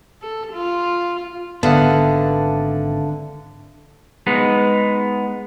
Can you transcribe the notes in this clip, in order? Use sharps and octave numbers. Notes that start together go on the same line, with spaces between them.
A4
F4
G#1 D3 B3 E5 F5 A5
G#3 B3 D#4